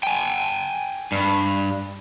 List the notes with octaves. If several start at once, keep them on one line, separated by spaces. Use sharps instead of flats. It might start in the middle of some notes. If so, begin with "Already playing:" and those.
G5 G#5
G2